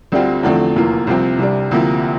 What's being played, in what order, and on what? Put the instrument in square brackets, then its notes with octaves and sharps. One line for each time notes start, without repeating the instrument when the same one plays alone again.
[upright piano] D2 D3 G3 C4 F4
E2 D3 F3 A3 C4
F1 E2 E3 A#3 F4
C2 C3 F3 C4
C2 C3 G3 D4
D2 C3 F3 A#3 E4